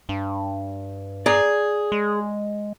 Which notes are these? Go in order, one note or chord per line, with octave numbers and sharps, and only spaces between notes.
G2
G#4 D5 A#5
G#3